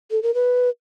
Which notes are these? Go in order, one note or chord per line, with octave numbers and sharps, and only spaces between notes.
A4
A#4
B4